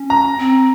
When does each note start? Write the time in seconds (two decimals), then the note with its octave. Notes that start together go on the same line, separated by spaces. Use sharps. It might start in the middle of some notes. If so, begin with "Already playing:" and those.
Already playing: C#4
0.10 A#5
0.38 C4